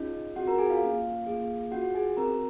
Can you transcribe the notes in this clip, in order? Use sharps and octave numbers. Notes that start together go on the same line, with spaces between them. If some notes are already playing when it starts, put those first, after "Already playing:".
Already playing: C#4 D#4 F4 G#4 D#5
C4 F4 F#4 G#4 F#5
A#4 A#5
G#4 G#5
F4 F5
A#3 C#4 F4
A#3 F4 G#4
C#4 F4 F#4 G#4 F#5
G#4 G#5
C4 F#4 A#4 A#5